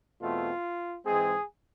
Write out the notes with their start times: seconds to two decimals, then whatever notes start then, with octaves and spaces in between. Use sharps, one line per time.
0.22 E2 B2 A3 C4 F4
1.06 G#2 E3 G#3 C4 G#4